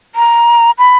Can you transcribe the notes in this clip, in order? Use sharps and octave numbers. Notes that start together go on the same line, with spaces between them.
A#5
B5